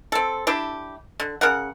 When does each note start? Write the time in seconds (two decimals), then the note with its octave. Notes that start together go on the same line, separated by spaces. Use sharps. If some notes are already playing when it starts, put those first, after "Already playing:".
0.12 C4 A4
0.47 D4 E4 G4
1.20 D3
1.41 C#3 A#4 F#5